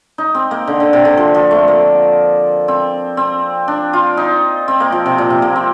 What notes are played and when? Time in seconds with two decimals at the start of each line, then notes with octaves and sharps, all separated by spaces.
0.18 D#4
0.35 C4
0.51 A#3
0.68 D3
0.80 D3
0.93 C3
1.05 D3
1.17 F3
1.35 F3
1.51 A3
1.68 A#3
2.68 C4
3.17 C4
3.68 D4
3.93 F4
4.17 D#4
4.68 C4
4.80 A#3
4.92 F3
5.06 C3
5.18 A#2
5.30 C3
5.42 A#3
5.56 C4